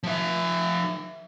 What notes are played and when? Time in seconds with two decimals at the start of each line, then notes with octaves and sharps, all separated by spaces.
0.03 F3 E5